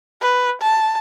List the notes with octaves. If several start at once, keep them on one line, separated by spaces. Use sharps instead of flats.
B4
A5